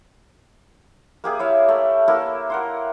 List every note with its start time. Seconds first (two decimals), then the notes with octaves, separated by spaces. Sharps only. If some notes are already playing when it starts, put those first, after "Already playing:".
1.24 A#3 G4 G#4
1.39 E4 C#5 E5 F5
1.68 A3
2.08 A#3 E4 A4
2.50 A#4 F#5 C6